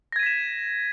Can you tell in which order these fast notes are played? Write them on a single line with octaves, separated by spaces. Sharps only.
A#6 G#6 D#7 B6 E7